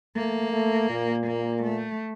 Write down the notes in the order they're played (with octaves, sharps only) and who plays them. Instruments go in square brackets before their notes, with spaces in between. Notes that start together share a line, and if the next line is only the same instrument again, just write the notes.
[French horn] A3 [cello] A#3
[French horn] A3
A#2
[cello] A#3
A3